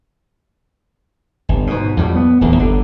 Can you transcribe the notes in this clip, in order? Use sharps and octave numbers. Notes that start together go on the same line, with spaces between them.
G1
G#2 B2
F2 A2 G3
B3
D1 E2 D3
G1 D3